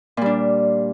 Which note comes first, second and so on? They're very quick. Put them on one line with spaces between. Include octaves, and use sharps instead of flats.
A#2 G3 D4